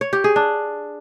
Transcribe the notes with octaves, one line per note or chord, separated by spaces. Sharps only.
C#5
G4
G#4
D4